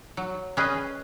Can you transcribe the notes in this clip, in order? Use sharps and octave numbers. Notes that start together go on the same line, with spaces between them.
F#3
C#4 G#4 B4 D#5